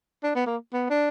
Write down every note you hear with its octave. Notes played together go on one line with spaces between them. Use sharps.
D4
B3
A#3
B3
D4